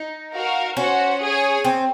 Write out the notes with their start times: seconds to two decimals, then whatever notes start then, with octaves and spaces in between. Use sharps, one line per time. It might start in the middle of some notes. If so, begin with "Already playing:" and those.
Already playing: D#4
0.33 F#4 A#4 F5
0.77 C#4 F#4 C5 F#5
1.21 G#4 C#5 G#5
1.65 C4